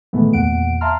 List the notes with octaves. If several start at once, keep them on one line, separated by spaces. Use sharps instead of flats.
A#2 D#3 E3 G#3 A3 B3
E2 A#2 F#5 D7
E5 F5 A5 A#5 C6 F6